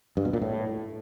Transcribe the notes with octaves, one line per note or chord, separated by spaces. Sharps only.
G2
B2
A#2
A2